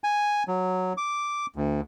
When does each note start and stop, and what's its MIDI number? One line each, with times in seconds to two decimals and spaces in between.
0.04 0.43 80
0.48 0.93 54
0.97 1.46 86
1.56 1.81 38